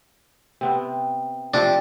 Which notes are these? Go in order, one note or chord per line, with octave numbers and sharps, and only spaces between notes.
C3 B3 C4
C3 F3 C4 D4